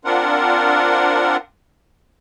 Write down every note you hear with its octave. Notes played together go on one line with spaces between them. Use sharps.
C4 D4 F4 A#4 F#5